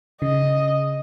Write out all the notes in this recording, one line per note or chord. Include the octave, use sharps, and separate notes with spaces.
C#3 D#5